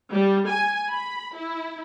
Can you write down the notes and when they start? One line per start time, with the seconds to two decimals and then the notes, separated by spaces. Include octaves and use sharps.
0.13 G3
0.49 G#5
0.90 B5
1.36 E4